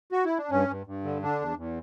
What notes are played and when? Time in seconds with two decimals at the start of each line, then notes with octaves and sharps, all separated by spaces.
0.12 F#4
0.25 E4
0.38 D4
0.50 G2 C#4
0.69 G2
0.87 G2
1.04 D3
1.22 D3 D4
1.40 E2
1.57 E2